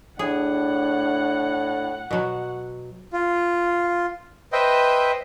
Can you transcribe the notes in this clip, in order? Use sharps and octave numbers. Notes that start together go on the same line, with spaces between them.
A2 D4 G#4 F#5
B2 F#3
F4
B4 C5 D#5 E5 G5